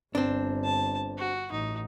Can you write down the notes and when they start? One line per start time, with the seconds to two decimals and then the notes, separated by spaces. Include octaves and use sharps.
0.15 G1 C4 D4
0.64 A5
1.18 F#4
1.52 A1 D#4